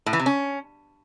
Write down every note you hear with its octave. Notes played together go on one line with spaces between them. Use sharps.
A2
E3
C3
C#4